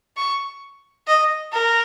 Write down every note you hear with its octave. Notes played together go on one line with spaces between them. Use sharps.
C#6
D#5
A#4